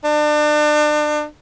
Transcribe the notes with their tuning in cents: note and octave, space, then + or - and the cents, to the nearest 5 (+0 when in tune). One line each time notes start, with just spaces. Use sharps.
D4 +35